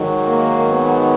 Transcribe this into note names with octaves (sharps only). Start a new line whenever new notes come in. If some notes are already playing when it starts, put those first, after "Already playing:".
Already playing: G#2 D#3 F#3
A#3
B3